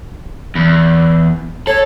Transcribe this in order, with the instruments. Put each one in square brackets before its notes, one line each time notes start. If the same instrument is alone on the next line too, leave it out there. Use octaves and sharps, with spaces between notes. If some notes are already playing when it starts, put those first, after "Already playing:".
[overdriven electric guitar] E2
[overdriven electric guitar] A4 [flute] C#5